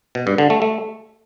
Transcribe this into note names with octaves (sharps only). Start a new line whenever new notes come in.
B2
G2
D3
A3
A3